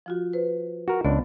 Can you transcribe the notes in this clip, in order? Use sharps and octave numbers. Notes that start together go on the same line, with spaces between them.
F3 F4 F#4
B4 C5
F#4 A#4
C#2 B3 D4